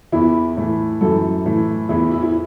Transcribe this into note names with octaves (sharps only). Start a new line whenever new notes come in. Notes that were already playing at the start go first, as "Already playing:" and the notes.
E2 E3 E4
A2 E3
F#2 E3 A4
A2 E3
E2 E3 E4
E4
E4